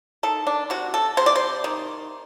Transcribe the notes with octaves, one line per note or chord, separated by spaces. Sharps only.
D#3 A4
D4
C3 F#4
A4
C3 C5
D5
C5
D#3